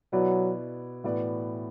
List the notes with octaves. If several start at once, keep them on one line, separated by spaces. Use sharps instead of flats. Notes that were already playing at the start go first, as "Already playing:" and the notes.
B2 F#3 B3 E4 B4 D5
A2 E3 B3 F#4 D5